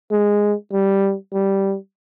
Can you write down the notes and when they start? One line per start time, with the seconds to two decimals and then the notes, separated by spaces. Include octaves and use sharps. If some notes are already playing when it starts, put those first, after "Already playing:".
0.11 G#3
0.73 G3
1.33 G3